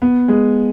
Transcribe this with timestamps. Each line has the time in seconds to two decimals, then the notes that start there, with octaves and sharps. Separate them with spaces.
0.02 B3
0.28 G#3